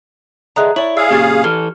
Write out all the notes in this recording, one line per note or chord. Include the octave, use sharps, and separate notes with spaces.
D3 E3 G#3 A#5 D#6 F#6
E4 C#5 D5 F#7
G#4 D5 F5 E6
A#2 C#3 G4 G#5 G#6 A6
E3 A4 F6